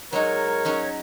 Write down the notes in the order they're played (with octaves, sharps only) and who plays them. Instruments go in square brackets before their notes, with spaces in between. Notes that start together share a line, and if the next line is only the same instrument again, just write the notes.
[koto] F#3 G#3 D#4 [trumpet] A#4 [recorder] C#5
[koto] F#3 C#4 D#4